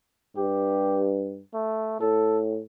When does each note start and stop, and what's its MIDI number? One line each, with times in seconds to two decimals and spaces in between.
0.37 1.41 43
0.37 1.10 67
1.54 1.99 57
2.00 2.61 45
2.00 2.40 69